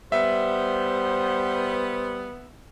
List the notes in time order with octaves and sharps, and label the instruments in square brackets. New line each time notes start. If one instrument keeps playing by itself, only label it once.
[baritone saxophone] G3 [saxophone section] B3 [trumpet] C5 [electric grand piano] E5